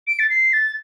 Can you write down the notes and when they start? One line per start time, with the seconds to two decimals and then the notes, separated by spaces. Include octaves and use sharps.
0.07 D7
0.19 A6
0.30 C7
0.53 A6